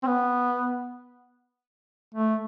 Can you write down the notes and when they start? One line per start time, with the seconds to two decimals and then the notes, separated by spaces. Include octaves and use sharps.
0.03 C4
0.07 B3
2.14 A3